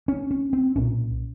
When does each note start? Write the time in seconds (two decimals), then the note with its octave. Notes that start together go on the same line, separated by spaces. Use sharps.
0.08 C#4
0.31 C#4
0.53 C4
0.76 B1 A#2 C#4